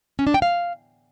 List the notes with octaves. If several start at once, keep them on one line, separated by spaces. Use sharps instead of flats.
C#4
D4
G5
F5